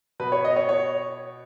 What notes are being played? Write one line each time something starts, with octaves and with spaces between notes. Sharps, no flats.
B2 B4
C#5
D#5
C#5
C#5